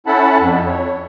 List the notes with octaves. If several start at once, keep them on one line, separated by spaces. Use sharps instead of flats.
C#4 E4 A4 F#5 A5 B5
F2
C#5